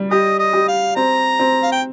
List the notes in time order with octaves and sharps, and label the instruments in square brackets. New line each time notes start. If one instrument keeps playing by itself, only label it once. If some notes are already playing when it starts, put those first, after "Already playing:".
Already playing: [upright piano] G3
[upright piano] G4 [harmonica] D#5
[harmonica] D#5
[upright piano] G4
[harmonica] F5
[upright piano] C4 [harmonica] A#5
[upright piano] C4
[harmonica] F5
G5